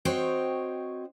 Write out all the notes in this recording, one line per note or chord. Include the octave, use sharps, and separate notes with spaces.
C4 F#4 C5 C#5 D#5 G5